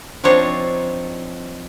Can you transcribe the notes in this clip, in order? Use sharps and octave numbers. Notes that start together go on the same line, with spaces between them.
F3 C4 D4 D#4 C#5